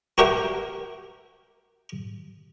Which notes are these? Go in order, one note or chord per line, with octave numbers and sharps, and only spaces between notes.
F#4 G4 A#4 E5 F#5 G5